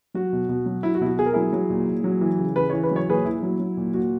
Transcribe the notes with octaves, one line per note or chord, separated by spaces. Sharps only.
F#3 F#4
B2
B2
F#3
F#3 E4
F#4
B2 E4
F#4
B2 G#4
A#4
F#3 E4 G#4
F#3
A#2
A#2
F#3
E3
C#3
C#3 B4
E3 C#5
B4
F#3 C#5
A#2 G#4 B4
A#2 E4
F#3
F#3
A#2
A#2 F#4